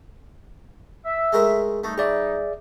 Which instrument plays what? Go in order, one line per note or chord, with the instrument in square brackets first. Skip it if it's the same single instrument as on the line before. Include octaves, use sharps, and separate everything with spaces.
[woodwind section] E5
[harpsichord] G#3 A3 A#4
[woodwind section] G3 D#4 [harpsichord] A3
[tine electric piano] G#4 D5 E5 [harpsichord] C#6